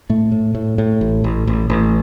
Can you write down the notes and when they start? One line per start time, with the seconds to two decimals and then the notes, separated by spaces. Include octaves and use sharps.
0.10 A2 A3
0.32 A2
0.55 A2
0.78 A2
1.01 A1
1.24 A1
1.47 A1
1.70 A1